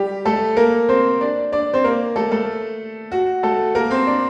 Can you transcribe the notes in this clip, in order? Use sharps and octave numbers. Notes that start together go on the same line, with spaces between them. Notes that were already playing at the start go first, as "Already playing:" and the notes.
Already playing: G3 G4
A3 A4
A#3 A#4
C4 C5
D4 D5
D4 D5
C4 C5
A#3 A#4
A3 A4
A3 A4
F#4
A3 A4
A#3 A#4
C4 C5
D4 D5